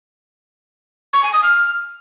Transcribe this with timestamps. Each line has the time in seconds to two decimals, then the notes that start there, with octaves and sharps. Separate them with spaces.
1.13 C#6
1.23 G#5
1.33 D#6
1.43 F6